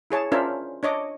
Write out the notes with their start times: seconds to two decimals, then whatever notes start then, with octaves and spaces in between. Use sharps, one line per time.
0.11 E4 G#4 C#5 A5
0.32 C#4 D4 F4 A#4 C5 E5
0.83 D4 C#5 D#5 D6